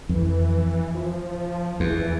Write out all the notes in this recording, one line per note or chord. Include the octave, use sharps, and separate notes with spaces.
F2 E3
F3
E2 E3